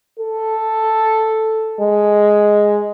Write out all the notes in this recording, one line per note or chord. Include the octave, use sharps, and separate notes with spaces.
A4
G#3